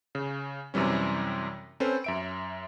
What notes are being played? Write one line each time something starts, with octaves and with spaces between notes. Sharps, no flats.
C#3
F#2 C3 E3 G3 C#4
C4 C#4 A4 B4 C5
F#2 E5 D7